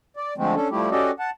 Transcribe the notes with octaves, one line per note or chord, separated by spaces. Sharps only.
D5
D3 F3 G#3 A3 C4
C#4 D4 A4
F3 G3 A3 E4 G4
C#4 F#4 G4 A4 D5 D#5
F#5 A5